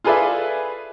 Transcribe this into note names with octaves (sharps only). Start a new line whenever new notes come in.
F4 G#4 A4 B4 D5 E5